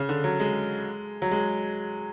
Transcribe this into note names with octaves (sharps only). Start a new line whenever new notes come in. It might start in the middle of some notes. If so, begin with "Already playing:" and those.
Already playing: C#3
D3
F#3
G#3
F#3
G#3